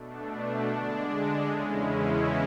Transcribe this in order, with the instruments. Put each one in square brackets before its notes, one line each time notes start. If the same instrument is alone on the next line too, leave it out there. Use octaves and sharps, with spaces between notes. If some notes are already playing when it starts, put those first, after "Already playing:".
Already playing: [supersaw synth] B2 A3 D4
D3 G#3 D4
E2 C#3 G#3 C#4 E4